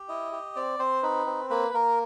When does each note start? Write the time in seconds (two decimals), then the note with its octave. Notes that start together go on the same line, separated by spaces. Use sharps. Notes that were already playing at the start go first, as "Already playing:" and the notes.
Already playing: G4
0.09 E4 D#5
0.32 G4
0.56 C4 D5
0.79 C4 C5
1.03 D#4 B4
1.27 C4
1.50 A#3 B4
1.74 A#3 A#4